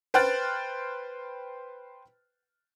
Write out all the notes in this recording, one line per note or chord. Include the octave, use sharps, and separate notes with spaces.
B4 C5 G5 F6 F#6 A6